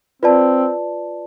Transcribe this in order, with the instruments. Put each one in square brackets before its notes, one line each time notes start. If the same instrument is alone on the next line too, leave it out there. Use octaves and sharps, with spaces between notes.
[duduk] C4 [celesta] F4 B4 D5 A5